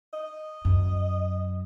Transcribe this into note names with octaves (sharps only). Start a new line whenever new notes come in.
D#5
F#2